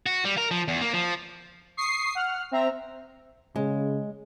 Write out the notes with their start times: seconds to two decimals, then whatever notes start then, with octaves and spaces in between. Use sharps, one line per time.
0.06 F#4
0.25 G3
0.38 A#4
0.51 F3
0.68 E2
0.81 A#3
0.94 F3
1.77 C#6 D#6 C7
2.15 F#5 F6
2.51 C4 E5 A#5
3.56 C#3 G#3